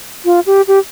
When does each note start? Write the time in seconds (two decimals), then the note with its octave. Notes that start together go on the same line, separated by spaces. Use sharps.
0.25 F4
0.46 G4
0.68 G4